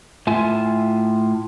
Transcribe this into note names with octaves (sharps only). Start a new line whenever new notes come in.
A2 F4 E5 G#5